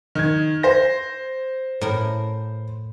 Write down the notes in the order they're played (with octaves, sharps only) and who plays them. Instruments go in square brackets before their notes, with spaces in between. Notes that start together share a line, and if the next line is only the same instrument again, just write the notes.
[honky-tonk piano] D#3 G#6
C5 A#6
[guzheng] A2 A#4